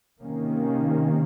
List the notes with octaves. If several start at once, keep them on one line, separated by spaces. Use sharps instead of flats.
C3 D#3 A#3 C#4